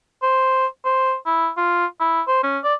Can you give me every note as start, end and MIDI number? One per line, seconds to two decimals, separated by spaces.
0.23 0.66 72
0.85 1.15 72
1.26 1.49 64
1.57 1.86 65
2.00 2.22 64
2.28 2.42 72
2.43 2.58 61
2.64 2.74 74